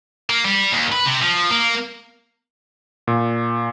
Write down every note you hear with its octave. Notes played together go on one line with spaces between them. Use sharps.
A#3
G3
D#2
B4
C3
F3
A#3
A#2